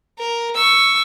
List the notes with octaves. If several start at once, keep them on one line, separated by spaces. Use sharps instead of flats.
A#4
C#6 E6